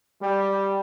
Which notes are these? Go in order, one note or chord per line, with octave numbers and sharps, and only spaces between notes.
G3